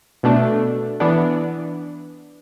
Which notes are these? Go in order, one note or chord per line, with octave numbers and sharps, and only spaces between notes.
B2 A3 D4
E3 B3 D4